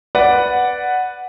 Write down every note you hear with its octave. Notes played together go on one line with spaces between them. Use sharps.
B4 D5 F#5